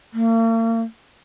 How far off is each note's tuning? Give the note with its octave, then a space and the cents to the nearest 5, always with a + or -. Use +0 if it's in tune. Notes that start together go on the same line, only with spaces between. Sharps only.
A#3 -40